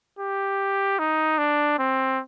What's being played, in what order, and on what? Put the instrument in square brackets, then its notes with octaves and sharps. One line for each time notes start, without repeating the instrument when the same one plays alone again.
[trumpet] G4
D#4
D4
C4